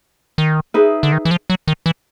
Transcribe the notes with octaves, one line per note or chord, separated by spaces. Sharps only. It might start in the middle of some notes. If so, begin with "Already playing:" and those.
D#3
D#4 G#4 B4 E5
D3
D#3
E3
F3
F#3
D#3
E3